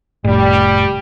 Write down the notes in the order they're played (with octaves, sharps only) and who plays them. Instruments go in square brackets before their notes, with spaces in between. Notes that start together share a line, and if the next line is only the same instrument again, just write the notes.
[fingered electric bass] F1 A2 [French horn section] G3